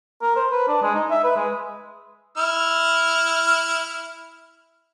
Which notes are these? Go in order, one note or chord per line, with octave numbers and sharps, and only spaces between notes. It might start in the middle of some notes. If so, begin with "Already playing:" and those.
A#4
C5
B4
D4
G#3
D#4
E5
B4
G#3
E4 F6